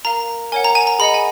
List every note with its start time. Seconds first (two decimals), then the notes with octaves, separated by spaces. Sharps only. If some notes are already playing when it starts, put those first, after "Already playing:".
0.05 A#4 F5 A#5
0.52 A#4 C#5 F#5 G#5
0.64 A#5
0.75 G#5
0.87 A#5
0.99 G#4 D#5 F#5 B5
1.14 G#5